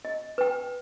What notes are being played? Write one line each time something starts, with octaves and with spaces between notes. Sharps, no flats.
D#5
B4 G5